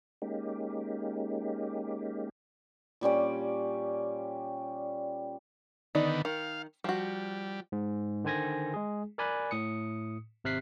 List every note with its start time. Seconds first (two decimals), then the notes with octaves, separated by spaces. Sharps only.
0.22 G#3 A#3 C#4 D#4 G4
3.01 A#2 G3 C#4 D5
5.95 D3 D#3 B3 D#4 D5
6.25 D#3 F5
6.84 F3 G3 F#4
7.72 G#2
8.24 D3 D#3 C5 G#5 G#6 A#6
8.74 G#3 G#4
9.18 A#4 D5 G#5 B5 F#6
9.51 A2 D#6 C#7
10.44 G#1 C3 F6 F#6 B6 C7